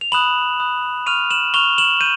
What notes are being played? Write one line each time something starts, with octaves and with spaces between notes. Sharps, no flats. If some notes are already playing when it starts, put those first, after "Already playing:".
F7
B5 D#6 F#6 E7 F#7
B5 D#6 F#6
C#6 F6 D#7 F7
E7 F#7
C#6 F6 F7 G7
E7 F#7
G6 D#7